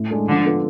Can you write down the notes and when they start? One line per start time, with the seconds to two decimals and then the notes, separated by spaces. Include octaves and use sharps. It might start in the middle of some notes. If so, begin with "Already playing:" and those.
Already playing: A2
0.11 G#3 D4 A4
0.28 D3 F3
0.45 B3 F4 A4